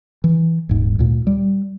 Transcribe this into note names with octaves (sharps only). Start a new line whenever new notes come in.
E3
D#1 G#2
D2 A#2
G3